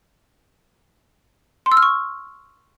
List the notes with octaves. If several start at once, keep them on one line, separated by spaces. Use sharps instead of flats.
C6
E6
F6
C#6